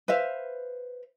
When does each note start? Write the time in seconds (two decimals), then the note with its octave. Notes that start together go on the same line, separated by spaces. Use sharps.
0.08 B4 C5 E5 F5